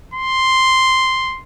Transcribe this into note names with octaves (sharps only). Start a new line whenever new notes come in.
C6